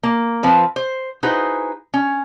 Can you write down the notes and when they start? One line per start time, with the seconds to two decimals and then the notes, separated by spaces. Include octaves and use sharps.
0.03 A#3
0.43 F3 C4 B4
0.76 C5
1.23 D#4 E4 F#4 G#4 B4 C5
1.94 C#4